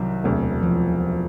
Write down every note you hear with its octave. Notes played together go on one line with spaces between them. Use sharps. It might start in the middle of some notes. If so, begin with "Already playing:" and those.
Already playing: C2 C3 D#3 F#3
E1 D2 C3
F3